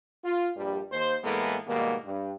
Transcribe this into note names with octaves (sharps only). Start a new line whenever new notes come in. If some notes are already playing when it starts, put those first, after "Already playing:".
F4
A#1 G2 G3
D#2 C5
A2 E3 G#3 A#3 B3 A4
G#2 B2 D#3 G3 A#3
G2